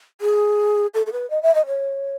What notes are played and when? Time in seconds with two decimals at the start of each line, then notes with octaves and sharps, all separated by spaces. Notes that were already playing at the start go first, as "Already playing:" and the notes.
0.21 G#4
0.94 A4
1.06 A4
1.12 B4
1.30 D#5
1.43 E5
1.55 D#5
1.66 C#5